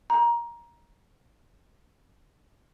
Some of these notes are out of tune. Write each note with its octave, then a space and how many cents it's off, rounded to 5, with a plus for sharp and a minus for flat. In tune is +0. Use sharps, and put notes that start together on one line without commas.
A#5 +15